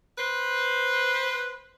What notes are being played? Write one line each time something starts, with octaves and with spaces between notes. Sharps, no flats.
B4 C5